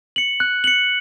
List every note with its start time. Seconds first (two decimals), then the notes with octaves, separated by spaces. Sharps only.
0.16 C#7 F#7
0.40 F#6
0.64 C#7 F#7